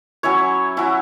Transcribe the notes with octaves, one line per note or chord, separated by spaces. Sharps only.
F#3 C#4 E4 C#5
F#3 C#4 E4